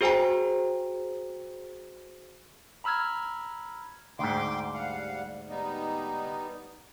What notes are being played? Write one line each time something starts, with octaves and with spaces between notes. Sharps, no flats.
F#4 G#4 C5 G5 G#5 A#5
A#5 B5 E6 F6 G#6
D2 G#2 G5 C6 D6
G3 F5 F#5
G3 B3 D#4